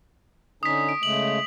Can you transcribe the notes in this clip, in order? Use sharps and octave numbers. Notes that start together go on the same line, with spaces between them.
D3 C#4 D#4 D#6 B6
D7
C#3 G#3 A3 F#7